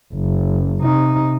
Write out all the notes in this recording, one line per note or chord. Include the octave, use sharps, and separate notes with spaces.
F#1
C3 D#4